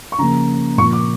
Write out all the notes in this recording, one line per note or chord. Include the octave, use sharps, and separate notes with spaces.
C#6
C#3 F3 A#3 A#5
A#2 F3 A#3 C#6
D6